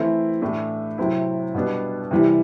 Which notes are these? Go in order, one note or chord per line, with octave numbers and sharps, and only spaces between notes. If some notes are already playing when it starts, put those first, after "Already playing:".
Already playing: E3 A3 C4 E4
A2 E3 A3 D4
C3 F#3 C4 E4
B2 G3 B3 D4
C3 E3 G3